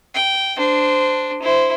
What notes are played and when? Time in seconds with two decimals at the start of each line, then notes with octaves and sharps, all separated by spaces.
0.14 G5
0.57 D4 C5
1.42 E4 C5